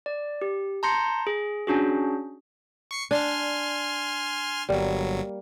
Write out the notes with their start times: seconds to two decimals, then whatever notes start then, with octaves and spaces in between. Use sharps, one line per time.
0.06 D5
0.42 G4
0.83 A5 A#5 C6 G6 A#6 C#7
1.27 G#4
1.67 C#4 D4 F#4 G#4
2.91 C#6 C7 C#7
3.11 D4 G#5 C6 F6
4.69 G1 F#3 G3 A#3